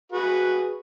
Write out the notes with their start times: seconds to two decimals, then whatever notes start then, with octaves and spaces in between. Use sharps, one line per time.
0.12 F#4 G#4 B4